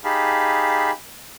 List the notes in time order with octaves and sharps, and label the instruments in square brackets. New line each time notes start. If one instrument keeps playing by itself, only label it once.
[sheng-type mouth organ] D#4 G4 G#4 F5 A5 B5